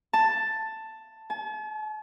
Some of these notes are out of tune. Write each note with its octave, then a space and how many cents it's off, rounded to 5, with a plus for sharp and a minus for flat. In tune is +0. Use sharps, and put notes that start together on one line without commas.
A5 +5
A5 -45